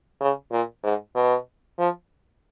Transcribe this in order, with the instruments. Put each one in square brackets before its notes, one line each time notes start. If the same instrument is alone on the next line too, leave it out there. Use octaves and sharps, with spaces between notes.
[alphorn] C#3
A#2
G#2
B2
F3